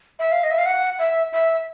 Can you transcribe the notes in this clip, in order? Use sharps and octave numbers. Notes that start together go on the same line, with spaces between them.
E5
F5
D#5
E5
F5
F#5
E5
E5